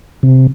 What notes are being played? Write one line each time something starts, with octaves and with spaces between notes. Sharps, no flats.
C3